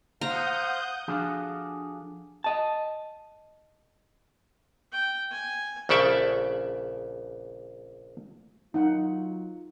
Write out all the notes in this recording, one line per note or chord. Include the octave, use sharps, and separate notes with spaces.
C5 F5 F#5 A#5 D#6 G6
F3 D4 F#4 G#4 A4 F5
D#5 A5
G5
G#5
A#1 C#3 A4 D5 E5
F#3 D#4 F4 F#5